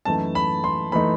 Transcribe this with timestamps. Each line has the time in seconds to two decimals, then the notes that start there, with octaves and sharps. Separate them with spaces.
0.05 F#2 E3 A3 D#4 A5
0.35 B5
0.64 C6
0.92 E3 A3 D#4 B5